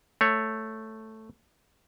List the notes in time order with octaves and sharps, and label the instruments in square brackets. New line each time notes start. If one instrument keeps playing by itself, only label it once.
[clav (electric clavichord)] A3 C#5